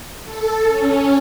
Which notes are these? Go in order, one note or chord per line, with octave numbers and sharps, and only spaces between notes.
A4
C#4